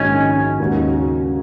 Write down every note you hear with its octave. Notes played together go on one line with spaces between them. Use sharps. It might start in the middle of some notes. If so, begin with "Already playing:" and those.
Already playing: A#1 G#2 D#3 G#3 C#4 F#4
D#2 C#3 G#3 C#4 F#4